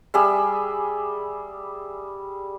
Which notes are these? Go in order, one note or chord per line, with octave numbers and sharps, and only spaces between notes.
G3 G#4 E5